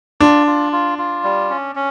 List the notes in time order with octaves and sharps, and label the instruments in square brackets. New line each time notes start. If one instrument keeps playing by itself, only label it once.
[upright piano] D4 [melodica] F4
[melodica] F4
F4
F4
G3
C#4
C#4